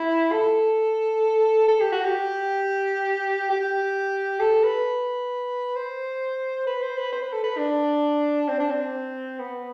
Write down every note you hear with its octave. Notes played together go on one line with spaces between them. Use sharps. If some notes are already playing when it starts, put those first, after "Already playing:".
Already playing: E4
A4
A4
G4
F#4
G4
G4
A4
B4
C5
B4
C5
B4
C5
B4
A4
B4
D4
C4
D4
C4
B3